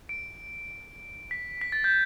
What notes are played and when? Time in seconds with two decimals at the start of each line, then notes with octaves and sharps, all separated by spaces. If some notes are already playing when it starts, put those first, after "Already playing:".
0.09 D7
1.31 B6
1.61 B6
1.72 A6
1.84 G6